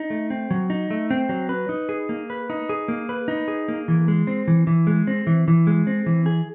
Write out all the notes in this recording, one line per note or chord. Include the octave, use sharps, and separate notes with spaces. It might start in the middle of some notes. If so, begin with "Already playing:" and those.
Already playing: D#4
A3
C4
F#3
D#4
A3
C4
F#3
B4
D#4
G#4
A#3
B4
D#4
G#4
A#3
B4
D#4
G#4
A#3
E3
G#3
C4
E3
E3
G#3
C4
E3
E3
G#3
C4
E3
G#4